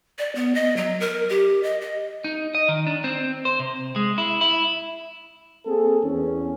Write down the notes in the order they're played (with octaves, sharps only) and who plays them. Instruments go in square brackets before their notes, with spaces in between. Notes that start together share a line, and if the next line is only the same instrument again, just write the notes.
[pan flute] D5
B3
D#5
F#3
A#4
G4
D#5
D#5
[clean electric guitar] D#4
D#5
D#3
D4
C4
C5
C3
G#3
E4
E4
[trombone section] A#3 C4 G#4 A4
E2 C#4